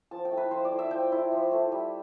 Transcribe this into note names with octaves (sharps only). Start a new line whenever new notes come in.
F3 A5
G5
A3 E4
B4
F3 C5
D5
A3 E4
E5
F3 G5
A3 E4
F3
A3 E4
G3